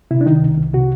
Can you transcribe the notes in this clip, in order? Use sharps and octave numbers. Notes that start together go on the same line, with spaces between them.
C3 E4
D4
D#3 D#4
C2
C2
C3 F#4